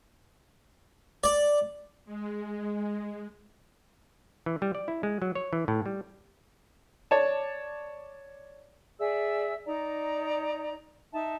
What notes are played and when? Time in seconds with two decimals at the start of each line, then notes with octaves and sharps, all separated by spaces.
1.24 D5
2.05 G#3
4.46 E3
4.62 G3
4.75 D5
4.88 E4
5.03 G#3
5.22 F#3
5.35 C#5
5.53 E3
5.68 A2
5.86 G3
7.11 C#5 D5 A5
8.99 G#4 D5 E5 E6
9.66 D#4 D5 A#5
11.13 D#4 E5 A5